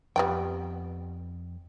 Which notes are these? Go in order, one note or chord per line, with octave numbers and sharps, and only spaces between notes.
F2 G3 B3 G5